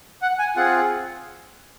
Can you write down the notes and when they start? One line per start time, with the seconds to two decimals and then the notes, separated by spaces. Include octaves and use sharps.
0.22 F#5
0.39 G#5
0.56 C4 F4 G#4 F#5